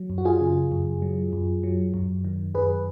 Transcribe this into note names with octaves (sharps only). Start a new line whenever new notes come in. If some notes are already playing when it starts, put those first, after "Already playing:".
Already playing: F#3
F#2
F#4
F4 G#4
C#3
F#2
F#3
F#2
F#3
F#2
D#3
F#2 G#4 B4